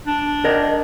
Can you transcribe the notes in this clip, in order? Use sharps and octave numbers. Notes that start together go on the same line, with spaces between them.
D4
A#4 D5 D#5